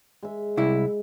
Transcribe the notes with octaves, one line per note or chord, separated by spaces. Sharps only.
G#3 E5
C2 E4